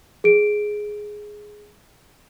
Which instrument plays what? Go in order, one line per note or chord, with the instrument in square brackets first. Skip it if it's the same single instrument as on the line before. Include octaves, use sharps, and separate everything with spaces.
[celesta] G#4 D7